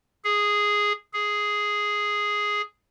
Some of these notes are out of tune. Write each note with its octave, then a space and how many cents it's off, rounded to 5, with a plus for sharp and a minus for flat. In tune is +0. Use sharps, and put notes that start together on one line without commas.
G#4 -5
G#4 +0